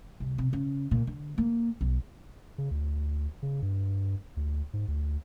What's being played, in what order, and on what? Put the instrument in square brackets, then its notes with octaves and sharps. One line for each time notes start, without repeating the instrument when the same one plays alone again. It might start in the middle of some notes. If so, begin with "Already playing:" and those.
[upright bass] C2
C3
C#3
A#2
D3
A#3
B1
[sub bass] C#3
D2
C#3
G2
D2
G#2
D2